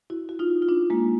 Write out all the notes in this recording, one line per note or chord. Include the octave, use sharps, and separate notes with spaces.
E4 F#4
F#4
D#4 F4
F4
D4 E4
G#3 A#3